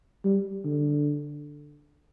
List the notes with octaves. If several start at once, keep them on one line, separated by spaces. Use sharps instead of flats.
G3
D3